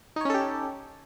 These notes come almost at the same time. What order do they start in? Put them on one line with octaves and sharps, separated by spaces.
D#4 C#5 C#4 A4 G4